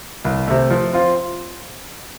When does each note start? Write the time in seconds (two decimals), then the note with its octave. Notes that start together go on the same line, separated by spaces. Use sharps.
0.25 C2
0.48 C3 A3
0.70 F3
0.93 C4 F4